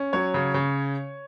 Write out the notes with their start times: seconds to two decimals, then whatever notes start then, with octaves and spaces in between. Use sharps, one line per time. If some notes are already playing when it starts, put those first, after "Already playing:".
Already playing: C#4
0.13 F#3 C#5
0.34 C#3
0.54 C#3